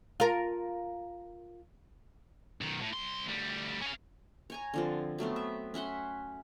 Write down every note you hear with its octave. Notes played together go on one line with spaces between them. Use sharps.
F4 A#4
B1 D#3
A2
C2 C6
D2 G3
C#4 F5
C#5 G#5 A#5
D3 F3 C4
F#3 A3 B3 C4
E5
C#4 E5 F#5 C6